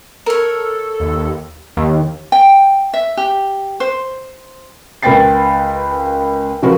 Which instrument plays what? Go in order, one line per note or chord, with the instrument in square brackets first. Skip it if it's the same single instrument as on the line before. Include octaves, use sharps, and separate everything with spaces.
[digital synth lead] A4 [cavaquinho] A#4 C#5
[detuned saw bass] D#2
[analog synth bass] D#2
[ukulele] G5
E5
G4
C5
[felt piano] C#2 A#4 B4 G5 A6 C7
C#3 F3 C#4 F#4 A#4 B4